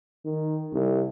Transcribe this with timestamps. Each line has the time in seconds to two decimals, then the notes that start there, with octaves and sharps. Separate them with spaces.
0.25 D#3
0.73 C2